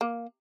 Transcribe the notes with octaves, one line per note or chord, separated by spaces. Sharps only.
A#3